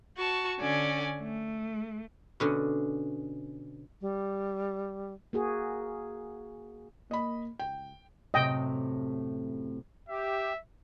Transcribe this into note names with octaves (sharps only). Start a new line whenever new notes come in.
F#4 A5 C#6
D3 C#4 D5 G#5
A3
B2 D3 C#4
G3
A#3 F#4 G#4
A#3 D#5 B5
C#2 G5
F#2 A2 C3 D#5 G5
G4 E5